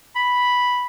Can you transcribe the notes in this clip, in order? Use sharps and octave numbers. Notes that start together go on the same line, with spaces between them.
B5